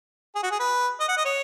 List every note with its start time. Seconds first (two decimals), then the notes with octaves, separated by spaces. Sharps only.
0.35 G#4
0.43 F#4
0.51 G#4
0.59 B4
1.00 D#5
1.08 F#5
1.17 D#5
1.25 C#5